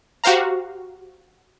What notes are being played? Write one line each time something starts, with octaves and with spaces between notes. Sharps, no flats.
F#4 G4 C5 F5 A#5